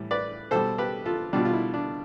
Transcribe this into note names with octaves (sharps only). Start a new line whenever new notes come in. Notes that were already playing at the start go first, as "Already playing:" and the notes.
Already playing: A2 E3 G3
B4 D5
B2 G3 A4 C5
G4 B4
F4 A4
B2 G3 D4 F4
F4
E4
D4